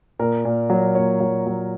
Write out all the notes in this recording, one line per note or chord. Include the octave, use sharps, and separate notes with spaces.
A#2 A#4
A#2
F#3
A#2 C#5
F#3
F#3